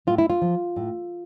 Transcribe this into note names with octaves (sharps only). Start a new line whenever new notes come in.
A2 F4
E4
F4
F3
A2